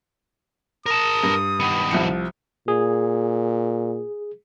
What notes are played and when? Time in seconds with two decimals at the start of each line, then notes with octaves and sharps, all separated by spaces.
0.86 A#4 A5 D#6
1.23 G2
1.60 D#3 B3
1.91 C2 F3 C#7
2.68 A#2 G#4